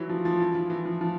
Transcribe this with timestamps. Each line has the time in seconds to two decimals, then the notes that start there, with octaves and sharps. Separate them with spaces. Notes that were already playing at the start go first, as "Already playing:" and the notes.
Already playing: E3 F#3
0.09 F3
0.25 F3
0.40 E3
0.55 F3
0.70 E3
0.85 F3
1.01 F3